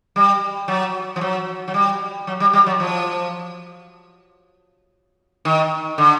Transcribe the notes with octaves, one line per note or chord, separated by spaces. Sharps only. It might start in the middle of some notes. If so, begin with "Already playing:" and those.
G3
F#3
F3
F#3
F#3
G3
F#3
G3
G3
F#3
F3
D#3
D3